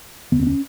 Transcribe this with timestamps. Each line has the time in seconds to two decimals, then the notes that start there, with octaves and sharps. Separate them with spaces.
0.32 F1 D#2 D3 B3
0.40 C4
0.47 C#4